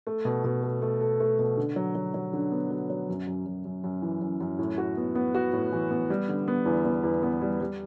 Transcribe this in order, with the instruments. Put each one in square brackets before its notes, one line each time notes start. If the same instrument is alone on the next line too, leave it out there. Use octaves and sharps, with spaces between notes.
[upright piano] A3
B2
B2
A3
A3
A4
A3
B2
D3
F#3
F#3
F#3
D3
B3
F#3
F#3
F#2
F#2
F#2
F#2
F#2
E3
F#2
F#2
A2
F#4
B3
B3
F#4
A2
E3
B3
G3
D3
B3
E2
B3
E2
B3
G3
G3